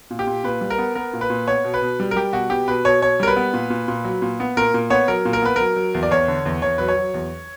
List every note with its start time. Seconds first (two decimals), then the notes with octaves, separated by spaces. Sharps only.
0.11 A#2
0.19 G4
0.27 A#2
0.44 A#2 B4
0.61 G3
0.70 A#4
0.78 B3
0.95 B3 A#4
1.13 A#2
1.21 B4
1.30 A#2
1.47 B3 C#5
1.64 B2
1.74 B4
1.82 B2
2.00 G3
2.11 A#4
2.16 G3 G4
2.33 B2 F#4
2.50 B3 G4
2.68 B2 B4
2.85 B2 C#5
3.01 B2 C#5
3.20 G3 A#4
3.27 B4
3.36 B3
3.53 A#2
3.70 A#2
3.88 A#2
4.04 F#3
4.22 A#2
4.40 B3
4.57 A#2 A#4
4.74 A#2
4.90 B3 C#5
5.08 F#3 A#4
5.25 A#2
5.33 A#4
5.42 B3 B4
5.56 F#3 A#4
5.76 F#3
5.94 E2
6.03 D5
6.11 E2 C#5
6.28 D3
6.45 E2
6.62 E2 C#5
6.78 F#3 B4
6.88 C#5
6.96 F#3
7.14 E2